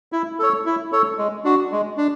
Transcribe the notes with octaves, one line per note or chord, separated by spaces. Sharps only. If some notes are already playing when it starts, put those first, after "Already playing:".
E4
A4 C#5
E4
A4 C#5
G#3
D4 F#4
G#3
D4